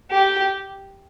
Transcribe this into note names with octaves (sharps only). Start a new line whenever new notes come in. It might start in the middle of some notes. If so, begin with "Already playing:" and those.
G4